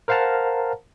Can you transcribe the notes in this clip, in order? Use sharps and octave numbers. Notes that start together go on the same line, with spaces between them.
A#4 C5 F5 F#5 A5 A#5